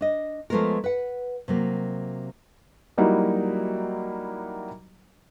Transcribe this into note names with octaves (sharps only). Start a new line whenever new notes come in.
D4 D#5
F3 G#3 A3 B3 F4 A#4
B4 F#5
C3 F#3 A#3
F#3 G3 A#3 D#4 E4 F#4